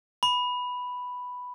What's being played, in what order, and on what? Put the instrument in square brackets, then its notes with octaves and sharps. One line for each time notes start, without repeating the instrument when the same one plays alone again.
[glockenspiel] B5